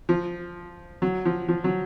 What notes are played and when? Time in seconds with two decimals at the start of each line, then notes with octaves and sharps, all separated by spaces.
0.09 F3
1.02 F#3
1.25 F3
1.48 F3
1.64 F#3